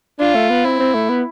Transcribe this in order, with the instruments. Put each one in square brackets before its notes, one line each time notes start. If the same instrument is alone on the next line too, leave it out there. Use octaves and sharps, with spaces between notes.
[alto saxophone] D4 [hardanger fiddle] F4
[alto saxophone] A3
B3
[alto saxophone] C4 [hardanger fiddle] E4
[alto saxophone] C4
A3
B3